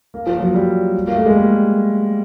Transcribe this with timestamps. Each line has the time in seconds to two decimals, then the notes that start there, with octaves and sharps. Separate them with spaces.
0.14 A#3
0.27 F3
0.40 F#3
0.54 G3
1.07 A#3
1.16 A3
1.26 G#3
1.34 G3